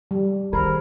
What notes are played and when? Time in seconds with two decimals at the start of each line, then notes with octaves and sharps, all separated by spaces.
0.11 G3
0.53 D#3 G#4 A#4 C5 B5